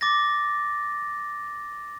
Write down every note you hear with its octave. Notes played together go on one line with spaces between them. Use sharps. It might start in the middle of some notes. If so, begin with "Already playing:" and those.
D6 A6 A#6